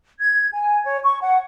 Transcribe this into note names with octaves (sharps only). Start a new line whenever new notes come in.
G#6
G#5
C#5
C#6
F#5